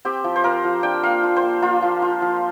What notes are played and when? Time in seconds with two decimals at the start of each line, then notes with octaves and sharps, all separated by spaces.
0.05 C4 G4
0.24 F3
0.36 C5
0.44 F4 A#4
0.64 F3
0.83 D4 G5
1.03 A#3 F5
1.23 F4
1.36 C5
1.43 A#3
1.62 A#3 F4
1.82 F3
2.02 F4
2.22 F3